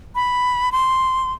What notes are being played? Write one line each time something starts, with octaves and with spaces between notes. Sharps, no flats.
B5
C6